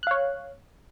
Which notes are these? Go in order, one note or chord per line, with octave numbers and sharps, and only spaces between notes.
C#5 F5 F#6